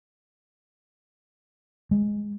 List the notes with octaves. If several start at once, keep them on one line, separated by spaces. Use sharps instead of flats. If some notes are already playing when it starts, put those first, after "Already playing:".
G#3